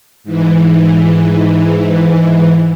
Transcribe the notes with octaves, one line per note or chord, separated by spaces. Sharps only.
G#2 E3